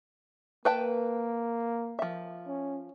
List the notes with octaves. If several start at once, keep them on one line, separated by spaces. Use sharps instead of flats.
A#3 B4 G5 A5
F3 E5
C#4